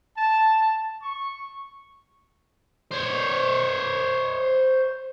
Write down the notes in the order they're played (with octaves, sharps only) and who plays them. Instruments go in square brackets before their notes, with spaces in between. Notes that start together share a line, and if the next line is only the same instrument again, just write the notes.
[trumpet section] A5
C#6
[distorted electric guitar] C5 C#5